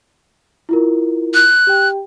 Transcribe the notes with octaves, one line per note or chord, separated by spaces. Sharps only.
E4 F4 A#4
F#6
G4 G5